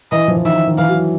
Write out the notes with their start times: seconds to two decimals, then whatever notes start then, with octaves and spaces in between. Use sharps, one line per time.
0.12 E3 D#5
0.28 F3
0.36 E3
0.45 D#3 E5
0.67 D#3
0.78 E3 F5
0.89 F#3